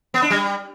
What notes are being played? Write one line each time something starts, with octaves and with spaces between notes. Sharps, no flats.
B3
D4
G3